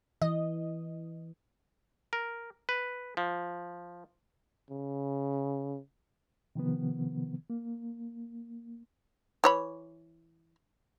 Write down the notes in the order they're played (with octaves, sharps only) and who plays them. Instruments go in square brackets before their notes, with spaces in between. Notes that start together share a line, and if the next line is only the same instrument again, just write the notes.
[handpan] E3 [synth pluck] D#5
[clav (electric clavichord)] A#4
B4
F3
[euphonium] C#3
[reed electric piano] C3 D#3 F3 B3
A#3
[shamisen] E3 C#5 B5